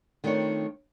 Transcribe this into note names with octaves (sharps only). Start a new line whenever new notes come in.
D#3 A3 C4 D4 F4 C#5